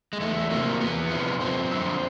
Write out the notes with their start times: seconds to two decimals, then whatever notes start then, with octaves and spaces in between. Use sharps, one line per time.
0.13 G#3
0.20 E2 A3
0.51 C3 F3 A#3
0.80 E2 B3
1.10 C3 F3
1.40 F#2 C4
1.71 D3 F3